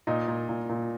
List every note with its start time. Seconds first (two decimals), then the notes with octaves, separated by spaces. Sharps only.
0.07 A#2 D#4
0.28 A#2
0.49 A#2
0.69 A#2